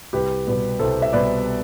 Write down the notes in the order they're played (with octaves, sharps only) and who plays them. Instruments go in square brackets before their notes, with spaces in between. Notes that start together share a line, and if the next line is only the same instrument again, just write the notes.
[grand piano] C2 G4 B4
B2 G3 B3
C2 A4 C5
E5
B2 G3 B3 B4 D5